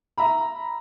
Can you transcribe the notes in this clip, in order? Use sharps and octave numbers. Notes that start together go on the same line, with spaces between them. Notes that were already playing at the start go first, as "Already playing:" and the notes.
E5 A#5 B5